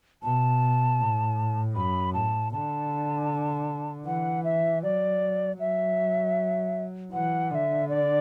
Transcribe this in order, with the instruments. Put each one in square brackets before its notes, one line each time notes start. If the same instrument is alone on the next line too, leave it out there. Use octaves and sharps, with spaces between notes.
[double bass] B2 [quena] A5
[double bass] A2
[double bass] F#2 [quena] B5
[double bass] A2 [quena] A5
[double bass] D3 [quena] A5
[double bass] E3 [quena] F#5
[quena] E5
[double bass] F#3 [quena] D5
[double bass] F#3 [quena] E5
[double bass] E3 [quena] F#5
[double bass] D3 [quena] E5 F#5
[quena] D5